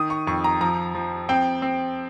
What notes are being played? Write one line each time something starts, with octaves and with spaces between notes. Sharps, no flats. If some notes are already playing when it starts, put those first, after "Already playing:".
Already playing: D#3 D#6
C#6
F2 C#6
A#5
F3 A#5
F3
C4 G5
C4